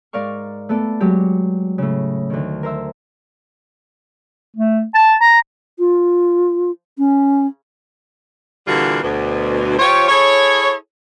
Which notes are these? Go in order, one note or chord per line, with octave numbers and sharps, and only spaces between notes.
G#2 A#4 D5 F5 C#6
A3 B3 A4 D5
F#3 G#3 G4
A2 C#3
D2 D#3
A#4 C5 E5
A3
A5
A#5
F4
C#4
A#2 D3 E3 G3 F4 F#4
D2 B2
F3 F4 G4 C#5
E4 G#4 A4 C#5